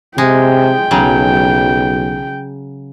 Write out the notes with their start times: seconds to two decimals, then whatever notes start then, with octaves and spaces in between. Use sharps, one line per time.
0.18 C3 G#3 G5
0.91 B1 C#3 F#3